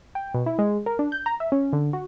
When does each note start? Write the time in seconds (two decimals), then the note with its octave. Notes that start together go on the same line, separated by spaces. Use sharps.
0.15 G5
0.34 B2
0.46 E4
0.59 G#3
0.86 A#4
0.99 D4
1.12 G6
1.26 A#5
1.40 E5
1.52 C#4
1.73 D3
1.93 F#4